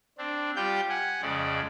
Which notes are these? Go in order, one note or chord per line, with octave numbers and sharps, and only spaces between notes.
C4 D4
G3 F4 G4 G5 G6
F#5 G#5
F2 C#3 G#3 D5